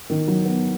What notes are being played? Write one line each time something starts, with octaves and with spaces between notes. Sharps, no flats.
D#3
F#3
B3